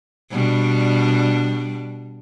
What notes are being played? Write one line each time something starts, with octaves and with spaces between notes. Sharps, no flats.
B2 G3 D4